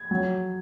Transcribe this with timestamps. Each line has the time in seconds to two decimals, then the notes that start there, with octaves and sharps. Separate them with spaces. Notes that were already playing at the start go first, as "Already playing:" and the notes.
Already playing: G#6
0.11 F#3